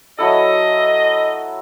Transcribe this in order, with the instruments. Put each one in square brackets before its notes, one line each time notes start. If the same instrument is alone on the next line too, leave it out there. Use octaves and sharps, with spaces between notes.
[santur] F#3 E4 A4 [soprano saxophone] D#5